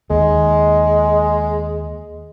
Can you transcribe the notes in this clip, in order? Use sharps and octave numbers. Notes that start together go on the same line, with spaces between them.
D#2 G#3